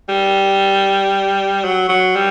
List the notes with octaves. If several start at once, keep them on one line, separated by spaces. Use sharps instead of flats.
G3
F#3
F#3
G3